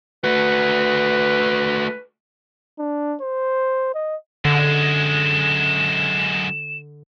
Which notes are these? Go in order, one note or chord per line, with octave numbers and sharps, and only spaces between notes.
A3 F#4 B4
D4
C5
D#5
F#2 D3 G#3 E7